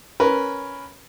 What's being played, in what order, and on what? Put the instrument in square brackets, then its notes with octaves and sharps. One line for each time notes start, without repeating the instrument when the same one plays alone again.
[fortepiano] C#4 A#4 B4